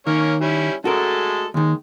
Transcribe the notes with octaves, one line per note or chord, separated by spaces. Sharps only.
D#3 A#3 C#4 C#5
G3 C#4 E4
G#3 A3 F#4 A4 A#4
D#2 D#3 G#3